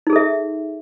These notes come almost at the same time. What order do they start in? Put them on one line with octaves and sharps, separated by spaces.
D#4 G#4 A4 E5